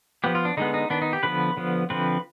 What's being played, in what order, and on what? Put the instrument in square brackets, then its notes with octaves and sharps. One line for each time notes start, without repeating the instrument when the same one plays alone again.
[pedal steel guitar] F3 B3 G4
F4
D4
D3 G#3 B3 D#4
D#4
D#3 B3 D4
D#4
G4
D3 F3 B3 B4
D3 F3 B3
D3 F3 C4 B4